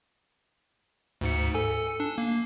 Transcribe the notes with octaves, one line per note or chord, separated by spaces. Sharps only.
D2 G#2 C#7
A4 G#5
D4
A#3